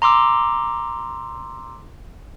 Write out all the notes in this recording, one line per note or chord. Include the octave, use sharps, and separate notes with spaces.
A#5 C6 D6 E6